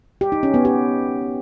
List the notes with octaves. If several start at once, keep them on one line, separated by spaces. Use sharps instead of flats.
G4
D#4
C#4
B3
G4